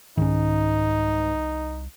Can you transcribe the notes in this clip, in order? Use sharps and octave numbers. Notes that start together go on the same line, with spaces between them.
C2 G#2 D#3 C#4 D#4